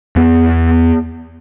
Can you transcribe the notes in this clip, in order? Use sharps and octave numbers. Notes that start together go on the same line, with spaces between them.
E2 B3